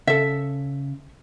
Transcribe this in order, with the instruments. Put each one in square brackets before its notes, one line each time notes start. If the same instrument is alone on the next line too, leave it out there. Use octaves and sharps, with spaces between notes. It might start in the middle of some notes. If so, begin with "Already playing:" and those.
[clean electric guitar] C#3 [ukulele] A4 E5